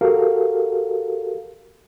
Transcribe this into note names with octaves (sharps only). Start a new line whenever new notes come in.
F#4 G4 A4 A#4 F5